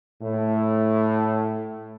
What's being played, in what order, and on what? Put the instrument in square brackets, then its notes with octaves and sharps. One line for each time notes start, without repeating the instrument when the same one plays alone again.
[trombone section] A2